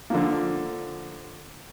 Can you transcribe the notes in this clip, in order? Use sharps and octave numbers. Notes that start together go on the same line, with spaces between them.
D3 F3 A#3